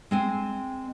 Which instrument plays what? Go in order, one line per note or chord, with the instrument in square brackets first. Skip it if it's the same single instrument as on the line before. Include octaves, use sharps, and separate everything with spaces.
[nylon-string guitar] G#3 C4 G#5